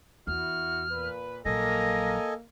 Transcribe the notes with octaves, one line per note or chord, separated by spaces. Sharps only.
E2 E4 F#4 F6
A#2 B4
A#1 F#3 A#3 A4 D#5 G#5 A#6